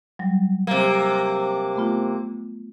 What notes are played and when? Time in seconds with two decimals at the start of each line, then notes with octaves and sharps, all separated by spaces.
0.19 F#3 G3
0.67 C3 A#3
1.76 A3 B3 F4